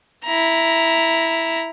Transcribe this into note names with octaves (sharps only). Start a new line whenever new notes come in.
E4 A#5